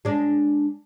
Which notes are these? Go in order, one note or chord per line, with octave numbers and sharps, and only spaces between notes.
G#3 D4